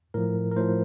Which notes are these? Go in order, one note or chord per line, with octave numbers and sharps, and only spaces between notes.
A2 F3 A#4
A#4
A2 F3 C5